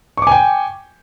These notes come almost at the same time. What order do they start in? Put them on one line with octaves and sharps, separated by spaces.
C#6 D6 G#5 G5